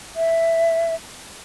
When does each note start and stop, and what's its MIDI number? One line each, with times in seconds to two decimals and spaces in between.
0.16 0.95 76